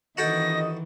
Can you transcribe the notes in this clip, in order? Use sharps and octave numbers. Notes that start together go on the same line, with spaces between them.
G1 D#3 E3 F#4 A4 D#5 G5 A#6